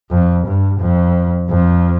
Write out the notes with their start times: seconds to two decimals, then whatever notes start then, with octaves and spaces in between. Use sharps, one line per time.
0.11 F2
0.46 G2
0.80 F2
1.50 F2